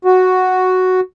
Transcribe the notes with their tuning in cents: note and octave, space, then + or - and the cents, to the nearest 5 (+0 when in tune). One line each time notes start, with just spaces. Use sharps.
F#4 +0